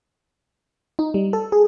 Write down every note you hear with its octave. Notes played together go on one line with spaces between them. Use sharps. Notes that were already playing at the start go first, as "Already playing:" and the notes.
D#4
G3
A4
G#4